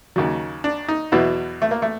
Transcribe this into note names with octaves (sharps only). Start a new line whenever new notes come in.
D#2 C#3 F#3
D4
D#4
E2 B2 F#3 E4
A3
A#3
A3